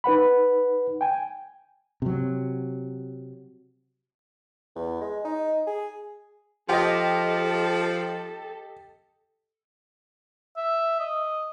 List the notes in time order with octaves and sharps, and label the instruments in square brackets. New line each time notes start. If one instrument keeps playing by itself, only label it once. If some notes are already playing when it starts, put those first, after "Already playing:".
[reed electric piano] D#4 B4 F#5 B5
G5 G#5
[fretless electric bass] C3 F#3
[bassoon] E2
G#3
D#4
G#4
[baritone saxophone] F3 [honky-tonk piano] G4 D#5 [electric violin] A4
[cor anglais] E5
D#5